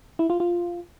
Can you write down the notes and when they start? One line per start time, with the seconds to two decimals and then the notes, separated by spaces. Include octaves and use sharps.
0.19 E4
0.30 F4
0.40 F4